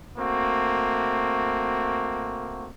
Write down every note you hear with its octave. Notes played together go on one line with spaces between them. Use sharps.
A3 A#3 C4 F#4